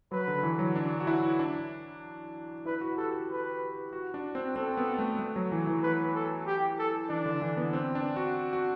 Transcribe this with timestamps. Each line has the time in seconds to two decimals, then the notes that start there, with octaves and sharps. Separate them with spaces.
0.11 F#3 B4
0.28 D3
0.43 E3
0.59 F#3
0.75 D4
1.00 F#4
1.07 E4
1.39 D4
2.66 E4 B4
2.81 F#4
2.97 G4 A4
3.14 F#4
3.30 B4
3.93 F#4
4.14 D4
4.35 C4
4.56 C4 A4
4.77 B3
4.98 A3
5.19 A3
5.36 F#3
5.52 E3
5.67 E3
5.83 B4
6.15 A4
6.47 G4
6.79 A4
7.10 E3 D4
7.26 D3
7.42 E3
7.57 B3
7.73 C4
7.95 D4
8.16 F#4
8.53 F#4